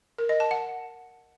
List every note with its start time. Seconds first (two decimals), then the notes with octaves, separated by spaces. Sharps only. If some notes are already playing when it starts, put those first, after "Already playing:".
0.18 A#4
0.29 D#5
0.40 A5
0.51 F#5